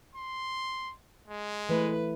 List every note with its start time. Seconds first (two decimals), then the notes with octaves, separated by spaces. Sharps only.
0.15 C6
1.27 G#3
1.69 E3 A3 B4